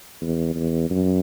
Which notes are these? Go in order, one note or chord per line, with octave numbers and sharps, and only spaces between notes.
E2
E2
F#2